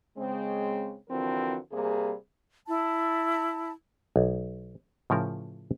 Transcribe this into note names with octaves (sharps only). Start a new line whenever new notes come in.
C#3 G#3 C4
D3 E3 F3 C4 F#4 A#4
C3 G3 A#3 G#4
E4 A5
B1
A2 C#3 F3 A#4